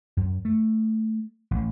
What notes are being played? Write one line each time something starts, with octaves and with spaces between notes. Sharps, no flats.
F#2
A3
A1